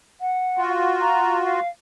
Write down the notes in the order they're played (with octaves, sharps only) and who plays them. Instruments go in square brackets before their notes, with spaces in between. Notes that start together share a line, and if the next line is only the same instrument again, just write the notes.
[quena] F#5
[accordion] F4 F#4
[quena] A#5
F5